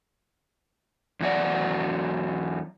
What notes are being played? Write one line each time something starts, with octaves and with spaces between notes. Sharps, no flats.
E2 F#3 F#4 D5